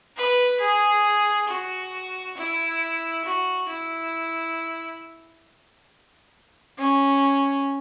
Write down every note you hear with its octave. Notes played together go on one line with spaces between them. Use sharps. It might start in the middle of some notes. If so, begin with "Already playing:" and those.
B4
G#4
F#4
E4
F#4
E4
C#4